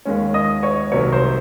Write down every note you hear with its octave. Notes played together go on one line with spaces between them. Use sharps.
D#2 D#3 G#3 C#4
D#5 D#6
C#5 C#6
C2 C3 D#3 F#3 C#5 C#6
C5 C6